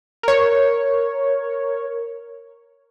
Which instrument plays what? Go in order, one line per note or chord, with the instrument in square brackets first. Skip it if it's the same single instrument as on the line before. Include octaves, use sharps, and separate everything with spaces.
[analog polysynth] A#4 C#5